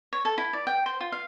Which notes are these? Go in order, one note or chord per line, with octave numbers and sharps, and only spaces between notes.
C#5
A4
E4
D5
G5
C5
F4
F5